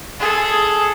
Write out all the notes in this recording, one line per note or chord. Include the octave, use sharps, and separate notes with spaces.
G#4 A4